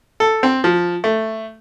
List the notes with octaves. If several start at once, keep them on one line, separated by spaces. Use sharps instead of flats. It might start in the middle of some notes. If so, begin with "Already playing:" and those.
A4
C4
F3
A3